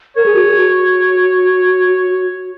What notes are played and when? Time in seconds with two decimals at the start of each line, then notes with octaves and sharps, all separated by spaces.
0.16 A#4 C#5
0.26 G#4
0.35 F#4
0.45 G#4
0.55 F#4